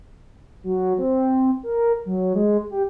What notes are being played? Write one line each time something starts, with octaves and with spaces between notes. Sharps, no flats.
F#3
C4
A#4
F#3
G#3
G4